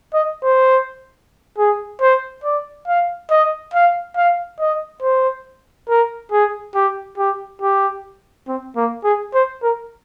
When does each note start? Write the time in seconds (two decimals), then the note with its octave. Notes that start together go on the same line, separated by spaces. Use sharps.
0.14 D#5
0.43 C5
1.58 G#4
2.01 C5
2.44 D5
2.87 F5
3.30 D#5
3.74 F5
4.16 F5
4.60 D#5
5.02 C5
5.89 A#4
6.32 G#4
6.75 G4
7.18 G4
7.61 G4
8.47 C4
8.76 A#3
9.04 G#4
9.34 C5
9.63 A#4